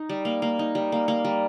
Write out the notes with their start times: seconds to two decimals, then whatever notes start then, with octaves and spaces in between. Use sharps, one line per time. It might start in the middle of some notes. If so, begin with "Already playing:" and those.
Already playing: D#4
0.09 G3
0.25 A#3
0.42 A#3
0.59 D#4
0.75 G3
0.92 A#3
1.08 A#3
1.25 G3